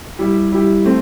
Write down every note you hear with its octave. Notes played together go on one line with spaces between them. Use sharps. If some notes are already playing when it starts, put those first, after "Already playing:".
G3 E4 G4
G3 E4 G4
A3 C4